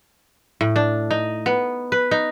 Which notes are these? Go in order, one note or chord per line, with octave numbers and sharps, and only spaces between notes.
A2
D4
D#4
B3
B4
D#4